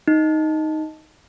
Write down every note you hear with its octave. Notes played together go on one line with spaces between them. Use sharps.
D#4